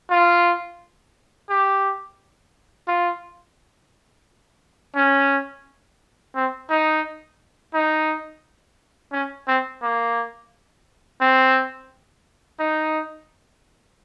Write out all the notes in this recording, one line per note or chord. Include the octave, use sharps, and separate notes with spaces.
F4
G4
F4
C#4
C4
D#4
D#4
C#4
C4
A#3
C4
D#4